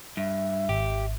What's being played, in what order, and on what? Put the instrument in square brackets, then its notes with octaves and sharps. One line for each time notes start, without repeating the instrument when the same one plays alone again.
[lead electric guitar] G2 [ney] E5
[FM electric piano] G#1 [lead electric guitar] G4